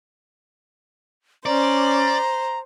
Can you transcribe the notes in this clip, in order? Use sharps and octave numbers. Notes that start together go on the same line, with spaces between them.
C#4 C5 D5 A#5